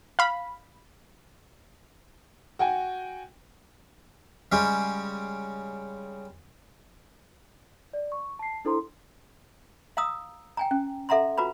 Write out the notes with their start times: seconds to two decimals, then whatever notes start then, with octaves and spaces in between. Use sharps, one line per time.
0.19 F5 B5
2.59 F#4 G5 G#5
4.52 C#3 G3 G#3 C#4 G4
7.93 D5
8.12 C#6
8.39 A5 C7
8.65 D4 E4 A4 C5 A#5 C6
9.97 F5 A#5 D#6 E6
10.57 G5 G#5 A#5
10.71 C#4
11.09 A4 E5 F#5 A#5 C6
11.38 F4 F#4 B4 A#5 B5